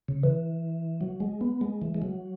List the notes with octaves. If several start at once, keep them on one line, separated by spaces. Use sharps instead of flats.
C#3
E3
F#3
G#3
B3
G#3
E3
G#3
F#3